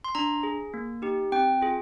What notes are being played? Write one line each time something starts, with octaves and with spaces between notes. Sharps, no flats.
C6
D4 A#5
G#4
A#3
D#4 G4
C4 G5
F4 G#4